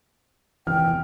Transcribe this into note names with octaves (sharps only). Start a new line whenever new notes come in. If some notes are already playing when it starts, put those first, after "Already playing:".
E2 C3 E3 G5 F6